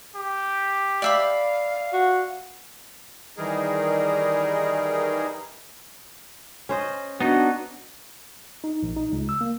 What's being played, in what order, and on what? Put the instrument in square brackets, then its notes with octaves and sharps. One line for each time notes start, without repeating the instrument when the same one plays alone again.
[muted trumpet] G4
[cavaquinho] D5 E5 B5 [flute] F5
[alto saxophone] F#4
[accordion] D#3 E3 G3 D#4 G#4 A#4
[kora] C#4 C5 D#5
[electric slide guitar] B3 D#4 [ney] D4 [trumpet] F#4
[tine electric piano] D#4
A#1
D#4
C#2
E6
A#3